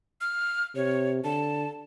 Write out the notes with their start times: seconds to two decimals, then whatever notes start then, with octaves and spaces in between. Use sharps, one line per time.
0.21 F6
0.76 C3 C#5
1.24 D3 A5